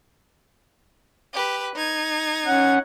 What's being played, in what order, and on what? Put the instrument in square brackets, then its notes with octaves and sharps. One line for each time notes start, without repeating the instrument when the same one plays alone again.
[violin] G4 B4
D#4 G#6
[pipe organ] C#4 F#5